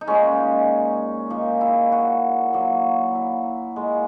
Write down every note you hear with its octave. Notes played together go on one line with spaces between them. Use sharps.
D#4
A#2 G#3 C#4
A#2 A#3 D#4
E4
F#4
A#2 F#3 A#3
E4
A#2 G#3